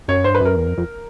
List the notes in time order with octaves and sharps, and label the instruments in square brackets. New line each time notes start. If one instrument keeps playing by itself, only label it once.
[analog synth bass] F#2 [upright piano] C#5
[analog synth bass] G2 [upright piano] C5
[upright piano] B4
[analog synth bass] F#2 [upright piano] A#4
[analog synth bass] E2
F2
F2